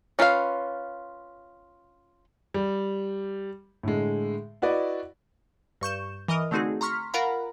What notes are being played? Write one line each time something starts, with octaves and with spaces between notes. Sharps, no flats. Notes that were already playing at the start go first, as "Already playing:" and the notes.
C#4 F4 B4 C5 F5
G3
A2 D3 G#3
E4 F#4 B4 D5 D#5
G2 C#6 G6 E7
E3 A#4 D#5 D#6 F6
D3 A3 C4 D#4 F#4 G#4
A#5 C6 C#6 F6 B6
F4 A#4 F5 F#5 A#5 B5